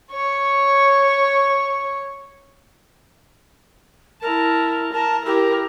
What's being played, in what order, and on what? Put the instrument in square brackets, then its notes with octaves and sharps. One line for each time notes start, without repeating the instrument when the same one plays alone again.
[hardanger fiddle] C#5 C#6
[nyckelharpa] E4 A5 [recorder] A#4
[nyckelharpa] A#4 [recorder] A5
[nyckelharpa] E4 G4 [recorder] A#4